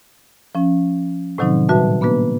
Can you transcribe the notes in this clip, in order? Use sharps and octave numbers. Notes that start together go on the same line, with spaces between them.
F3 C#4
A2 C3 D#3 F#3 C4 D#4
A#2 G3 F#4 B4 E5 A5
A#3 B3 D4 F#4 B4